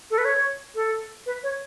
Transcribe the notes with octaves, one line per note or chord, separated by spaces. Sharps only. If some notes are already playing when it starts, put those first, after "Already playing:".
A4
B4
C#5
A4
B4
C#5